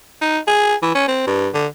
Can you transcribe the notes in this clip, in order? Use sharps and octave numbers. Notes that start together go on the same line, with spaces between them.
D#4
G#4
E3
C#4
C4
G2
D3